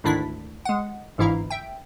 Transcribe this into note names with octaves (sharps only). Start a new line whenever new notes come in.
D2 G#2 D#3 D4 E4 B6
G#3 F#5
G1 G#2 E3 E4 F5 A#5
E5 G5